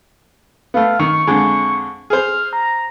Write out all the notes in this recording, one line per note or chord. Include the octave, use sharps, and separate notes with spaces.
A3 B3 F5
D#3 C#6
F2 D3 G#3
G#4 C5 F6
A#5